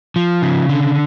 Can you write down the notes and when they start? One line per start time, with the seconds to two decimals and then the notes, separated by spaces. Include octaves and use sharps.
0.16 F3
0.42 C#3
0.69 D3